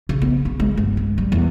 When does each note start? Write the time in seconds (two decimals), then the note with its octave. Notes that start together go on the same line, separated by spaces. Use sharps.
0.09 C#3
0.22 B3
0.45 C#3
0.60 G#3
0.77 G1
0.97 G#3
1.18 G3
1.32 E2